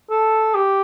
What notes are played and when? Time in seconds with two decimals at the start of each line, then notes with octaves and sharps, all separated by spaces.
0.11 A4
0.55 G4